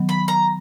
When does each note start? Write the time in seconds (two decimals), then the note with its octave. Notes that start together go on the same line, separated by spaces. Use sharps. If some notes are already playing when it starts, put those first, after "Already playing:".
Already playing: D#3 F#3 B3
0.09 B5
0.28 A#5